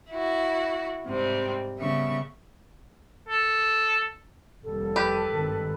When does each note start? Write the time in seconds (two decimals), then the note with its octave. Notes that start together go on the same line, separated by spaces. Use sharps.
0.12 E4 F#4
1.06 G#2 C3 G3 C4
1.78 C#3 G3 B3 E5 C#6
3.29 A4
4.63 F1 D#2 G3 A4
4.96 G4 B4
5.31 G#1 G2 D#3